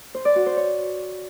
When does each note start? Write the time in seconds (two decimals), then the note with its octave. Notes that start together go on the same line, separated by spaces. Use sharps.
0.15 C5
0.25 D5
0.36 F#4
0.46 C5
0.57 C#5